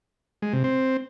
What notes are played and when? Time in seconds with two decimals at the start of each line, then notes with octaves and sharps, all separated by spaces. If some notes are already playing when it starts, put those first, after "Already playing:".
0.42 G#3
0.53 C3
0.64 C4